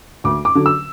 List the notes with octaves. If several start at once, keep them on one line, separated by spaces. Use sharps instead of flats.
D2 D6
D6
D3 F#3
E6